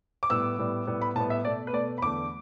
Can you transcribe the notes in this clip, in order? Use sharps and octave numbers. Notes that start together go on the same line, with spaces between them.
D6
A2 G3 B3 E6
A2 G3 B3
A2 G3 B3
B5
A2 G3 B3 A5
E5
B2 A3 D5
B4
B2 A3 D5
B5
E2 D3 A3 D6